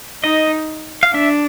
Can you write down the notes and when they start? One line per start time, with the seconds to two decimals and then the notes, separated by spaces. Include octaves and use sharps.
0.23 D#4 D#5
1.03 F5
1.14 D4 E5